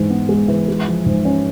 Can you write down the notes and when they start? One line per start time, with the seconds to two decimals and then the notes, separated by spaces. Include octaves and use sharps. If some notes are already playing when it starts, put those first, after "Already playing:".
Already playing: G#2 E3 G#3
0.10 B3
0.29 G#3
0.48 E3
0.68 G#3
0.88 F3
1.06 G#2
1.25 C#4